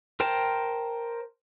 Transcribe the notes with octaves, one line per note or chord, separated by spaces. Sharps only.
A#4 C5 G5 A5